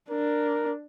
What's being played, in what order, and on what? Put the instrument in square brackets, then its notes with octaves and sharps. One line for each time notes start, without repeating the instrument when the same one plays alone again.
[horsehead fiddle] D4 [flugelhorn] A#4